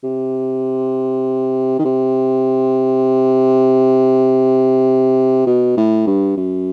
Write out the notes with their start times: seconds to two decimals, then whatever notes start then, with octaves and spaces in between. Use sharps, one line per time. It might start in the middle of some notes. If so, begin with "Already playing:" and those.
0.04 C3
1.79 D#3
1.85 C3
5.47 B2
5.77 A2
6.07 G2
6.37 F#2